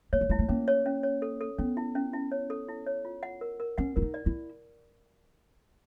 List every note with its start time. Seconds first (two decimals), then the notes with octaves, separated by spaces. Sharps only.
0.13 A#3 C#5
0.21 A3
0.29 G#3 E4
0.39 A3
0.49 A#3 C#4
0.68 C#5
0.86 C#4
1.03 C#5
1.22 A4
1.41 A4
1.58 B3 C#4
1.77 E4
1.95 C#4
2.13 E4
2.32 C#5
2.50 A4
2.68 E4
2.87 C#5
3.05 F4
3.23 F#5
3.41 A#4
3.60 A#4
3.78 C#4 F#5
3.96 E4 A#4
4.02 D#4
4.14 D5
4.26 E4